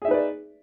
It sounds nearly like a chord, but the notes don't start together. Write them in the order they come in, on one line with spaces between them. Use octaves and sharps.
G#4 E5 D#4 B4 D5